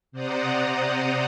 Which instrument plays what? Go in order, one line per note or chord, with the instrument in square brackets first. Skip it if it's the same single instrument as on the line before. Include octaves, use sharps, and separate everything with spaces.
[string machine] C3 C5 D5 F#5 A#5 D#6